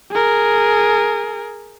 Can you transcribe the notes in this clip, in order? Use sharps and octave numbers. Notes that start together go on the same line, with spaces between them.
G#4 A#4